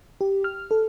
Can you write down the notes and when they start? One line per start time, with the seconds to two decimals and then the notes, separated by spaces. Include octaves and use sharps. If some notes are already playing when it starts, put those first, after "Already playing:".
0.21 G4
0.44 F6
0.71 A4